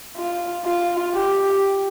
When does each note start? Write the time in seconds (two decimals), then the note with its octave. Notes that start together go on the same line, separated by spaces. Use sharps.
0.17 F4
0.66 F4
1.15 G4